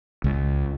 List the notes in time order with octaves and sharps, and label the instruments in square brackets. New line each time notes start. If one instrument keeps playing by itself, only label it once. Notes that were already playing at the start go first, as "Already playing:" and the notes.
[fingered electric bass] C#2